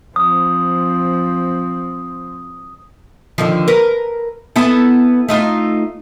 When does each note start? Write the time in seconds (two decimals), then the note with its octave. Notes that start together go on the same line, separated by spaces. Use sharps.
0.16 F3 C4 D#6
3.38 D3 D#3 F3
3.68 A#4 B4
4.56 B3 E4 A4
5.29 A3 D#4 F4